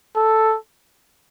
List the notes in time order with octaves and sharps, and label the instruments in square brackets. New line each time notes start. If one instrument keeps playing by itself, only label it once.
[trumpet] A4